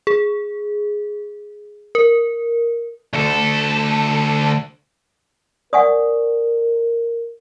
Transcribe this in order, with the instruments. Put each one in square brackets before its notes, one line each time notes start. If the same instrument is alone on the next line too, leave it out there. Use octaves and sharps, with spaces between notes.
[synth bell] G#4
A#4
[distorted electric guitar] D2 A4
[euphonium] A#4 [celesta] D5 G#5 [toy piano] F#5 C#6 D#6